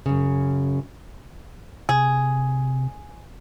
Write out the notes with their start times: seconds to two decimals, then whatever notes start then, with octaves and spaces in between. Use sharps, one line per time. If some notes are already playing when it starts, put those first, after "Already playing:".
0.06 F#2 C#3
1.89 C3 G#4